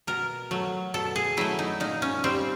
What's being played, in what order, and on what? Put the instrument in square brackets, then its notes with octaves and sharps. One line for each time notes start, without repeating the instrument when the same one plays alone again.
[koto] B2 A#4
F#3 A3
B2 A4
G#4
F#3 A3 E4
D#4
A#2 D#4
C#4
G3 C4